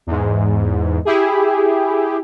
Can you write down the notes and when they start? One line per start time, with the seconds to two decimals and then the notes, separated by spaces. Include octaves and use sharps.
0.07 E2 G#2
1.05 E4 G4 G#4